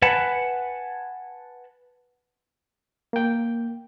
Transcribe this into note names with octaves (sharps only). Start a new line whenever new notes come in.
B4 F#5 G#5 A5 B5
A#3 G5